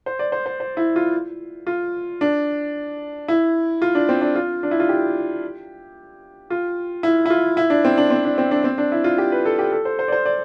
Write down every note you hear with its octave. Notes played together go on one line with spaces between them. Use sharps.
C5
D5
C5
C5
C5
E4
F4
F4
D4
E4
F4
D4
C4
D4
F4
D4
E4
F4
G4
F4
E4
E4
F4
E4
D4
C4
D4
C4
D4
C4
D4
C4
D4
E4
F4
G4
B4
A4
G4
A4
C5
C5
D5
C5
D5